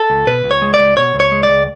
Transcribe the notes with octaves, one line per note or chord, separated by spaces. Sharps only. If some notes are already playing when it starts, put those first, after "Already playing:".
Already playing: A4
C#2
B2 B4
C#2
C#5
G#3
D5
C#2
B2 C#5
C#2
C#5
G#3
D5
C#2